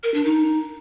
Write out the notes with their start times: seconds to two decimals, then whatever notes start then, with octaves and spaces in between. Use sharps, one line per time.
0.03 A#4
0.14 D4
0.25 D#4